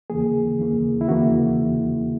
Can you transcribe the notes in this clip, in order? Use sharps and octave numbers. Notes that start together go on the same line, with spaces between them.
E2 C#3 E3 A#3 G#4
E2 C#3 E3 A#3
E4
E2 C#3 E3 A#3 F#4